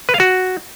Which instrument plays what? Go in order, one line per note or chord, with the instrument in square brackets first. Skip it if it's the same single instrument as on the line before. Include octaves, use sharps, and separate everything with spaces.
[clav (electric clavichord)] B4
F5
F#4